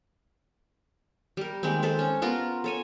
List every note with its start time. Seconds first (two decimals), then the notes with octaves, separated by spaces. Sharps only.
1.37 G3 A#4
1.63 D#3 G#3 A#3 C4
1.82 G#3 A4 C5
1.99 C#4
2.22 B3 F4 A#4
2.64 A4 C#5 G#5